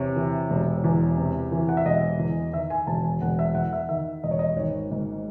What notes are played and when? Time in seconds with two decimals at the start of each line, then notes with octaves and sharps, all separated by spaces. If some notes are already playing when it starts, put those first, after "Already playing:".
Already playing: E2 C3 C#5
0.16 E3
0.50 E1
0.84 E2
1.17 C3
1.52 E3
1.69 F#5
1.77 E5
1.85 E1 D#5
2.19 E2
2.53 D#3 E5
2.70 G#5
2.87 E1 A5
3.04 G#5
3.22 E1 F#5
3.39 E5
3.55 E2 F#5
3.73 E5
3.89 D#3 E5
4.23 E1 D#5
4.31 C#5
4.39 D#5
4.56 G#1 C#5
4.91 G#2